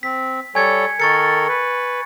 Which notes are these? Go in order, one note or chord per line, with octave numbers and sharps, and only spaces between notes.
C4 B6
G3 A4 C#5 G#5 G#6 C#7
D#3 A4 A#4 C#6 A6 C#7
B4